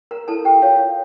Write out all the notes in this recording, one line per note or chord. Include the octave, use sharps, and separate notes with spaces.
A#4 A#5
E4 A4 A5
G4 G5
F4 C#5 F5